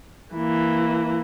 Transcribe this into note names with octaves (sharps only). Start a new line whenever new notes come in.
E3 A#3